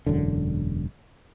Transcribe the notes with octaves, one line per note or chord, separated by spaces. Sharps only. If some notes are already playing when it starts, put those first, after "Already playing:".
E1 F#2 D3